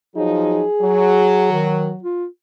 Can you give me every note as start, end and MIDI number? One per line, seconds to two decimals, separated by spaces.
0.15 0.63 53
0.15 0.63 54
0.15 0.63 63
0.15 1.50 68
0.81 2.00 54
1.52 1.91 51
2.03 2.26 65